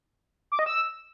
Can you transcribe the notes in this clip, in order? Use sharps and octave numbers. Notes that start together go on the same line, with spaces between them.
D6
D#5
E6